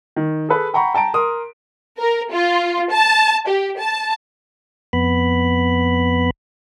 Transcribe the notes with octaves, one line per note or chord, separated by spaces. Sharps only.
D#3
G#4 A4 B4
F#5 G5 A#5 B5 C#6
G5 A5 A#5 D7
A#4 C6 D#6
A#4
F4
A5
G4
A5
F2 B3 B5